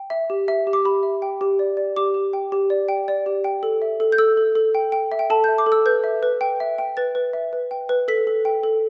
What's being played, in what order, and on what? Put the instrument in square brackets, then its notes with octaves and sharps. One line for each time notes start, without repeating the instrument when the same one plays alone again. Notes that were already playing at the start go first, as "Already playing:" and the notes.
Already playing: [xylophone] G5
E5
G4
E5
G4
D6
G4 B5
E5
G5
G4
D5
D5
G4 D6
G4
G5
G4
D5
G5
D5
G4
G5
A4
E5
A4
G6
A4 E6
A4
A4
G5
G5
E5
G5
A4 A5
E5 G6
D6
A4
E6
B4 G6
E5
B4
G5
E5
G5
B4 A6
B4
E5
B4
G5
B4
A4 B6
A4
G5
A4